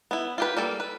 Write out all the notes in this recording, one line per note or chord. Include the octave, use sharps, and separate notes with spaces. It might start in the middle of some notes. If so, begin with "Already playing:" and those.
B3 E4
F4 G4 B4
G3 A#3 A4
B4